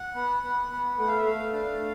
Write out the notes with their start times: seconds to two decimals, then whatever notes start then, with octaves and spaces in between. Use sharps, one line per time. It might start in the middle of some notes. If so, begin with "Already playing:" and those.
Already playing: F#5
0.15 B3
0.43 B3
0.71 B3
0.99 A3 F#5
1.08 F5
1.18 E5
1.26 A3 F5
1.53 D4